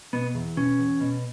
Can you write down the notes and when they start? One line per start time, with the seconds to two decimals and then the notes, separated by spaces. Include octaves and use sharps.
0.13 B2 B3
0.35 E2
0.57 B2 C#4
0.78 E2
1.01 B2